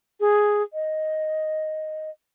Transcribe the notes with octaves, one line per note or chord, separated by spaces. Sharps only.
G#4
D#5